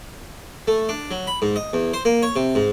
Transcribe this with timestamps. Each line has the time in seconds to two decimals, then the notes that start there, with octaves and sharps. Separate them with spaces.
0.68 A3
0.89 D4
1.11 F#3
1.27 B5
1.42 G#2
1.56 D#5
1.73 E2
1.94 C5
2.05 A#3
2.23 C#5
2.36 C3
2.55 G#2